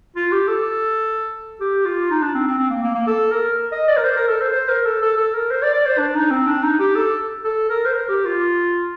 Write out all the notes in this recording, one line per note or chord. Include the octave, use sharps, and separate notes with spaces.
F4
G4
A4
G4
F4
D#4
D4
C4
C4
C4
A#3
A#3
A#3
A4
A#4
D#5
D5
A#4
C5
A#4
A4
C5
C5
A#4
A4
A4
A4
A#4
C5
D5
D5
C5
D4
D#4
C4
D4
D#4
G4
A4
A4
A#4
C5
A#4
G4
F4